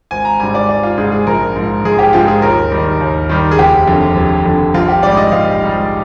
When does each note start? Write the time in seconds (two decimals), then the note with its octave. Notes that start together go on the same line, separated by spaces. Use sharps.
0.11 G#1 G#5
0.25 A#5
0.40 G#2 G3 G#5
0.55 D5
0.69 G#1 D5
0.83 F4
0.98 G#2 G3 G#4
1.12 G#4
1.27 A#1 A#4
1.56 G#2 F3
1.85 A#1 G#4
1.99 G4
2.13 G#2 F3 F4
2.28 G#4
2.42 D#2 A#4
2.72 D#3 G3
3.00 D#2
3.29 D#3 G3
3.51 G#4
3.58 F1 G4
3.88 F2 D3
4.17 F1
4.45 F2 D3
4.74 A#1 F4
4.89 G4
5.03 G#2 G3 D5
5.17 D#5
5.32 A#1 F5
5.61 G#2 G3